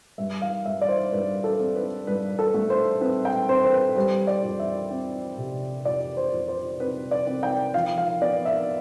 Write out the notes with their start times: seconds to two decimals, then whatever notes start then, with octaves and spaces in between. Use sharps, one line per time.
0.18 G2 E5
0.42 F5
0.65 G2 E5
0.82 D5
0.89 C5
1.12 G2 B4
1.44 A4
1.59 C4
1.75 B4
2.07 G2 B4
2.39 A4
2.54 A3
2.70 C5
3.01 C4 B4
3.25 G5
3.49 C4 C5
3.65 C5
3.72 B4
3.96 G3 C5
4.27 D5
4.44 F2
4.59 E5
4.91 C4
5.38 C3
5.85 F2 D5
6.17 C5
6.33 F2
6.48 C5
6.80 C4 B4
7.11 D5
7.27 C4
7.43 G5
7.74 F3 F5
7.98 F5
8.21 B3 D5
8.45 E5